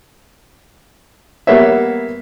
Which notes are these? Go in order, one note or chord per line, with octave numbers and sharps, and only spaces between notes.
G3 A#3 B3 C#5 E5